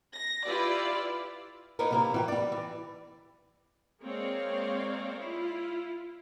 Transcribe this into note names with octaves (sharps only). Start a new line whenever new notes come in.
A#6
E4 F4 G4 B4 D5
A#3 C#4 D#4 A#4 B4
C3 A#3 E4
E3 F#4 G4
G3 D5
E3
G#3 A#3 C4 C#5 D5 F5
E4 F4